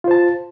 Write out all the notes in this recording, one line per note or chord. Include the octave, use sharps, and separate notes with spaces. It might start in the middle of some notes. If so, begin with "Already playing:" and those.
F4 C5 A5